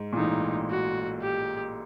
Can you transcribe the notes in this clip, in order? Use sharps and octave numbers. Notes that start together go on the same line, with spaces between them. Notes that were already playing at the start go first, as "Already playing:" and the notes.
Already playing: G#2
A#2
A1 A2 D#4
F#4
G4